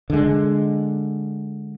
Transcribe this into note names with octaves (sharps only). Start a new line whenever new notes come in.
D3 G#3